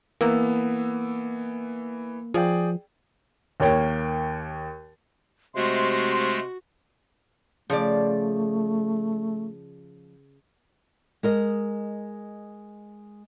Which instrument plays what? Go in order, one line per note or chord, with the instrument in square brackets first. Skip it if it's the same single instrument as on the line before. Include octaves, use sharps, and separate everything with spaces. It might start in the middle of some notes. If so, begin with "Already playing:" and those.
[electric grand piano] E3 B3 E6 [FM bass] A#3
[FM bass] F3 [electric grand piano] G#4 D5 G5
[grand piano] D#2 A#3 C#5 G5
[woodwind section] C3 C6 [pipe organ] G#3 A3 [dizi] F#4
[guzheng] C#3 [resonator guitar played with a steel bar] F3 D5 [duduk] A3
[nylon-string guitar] G#3 A#4 D#5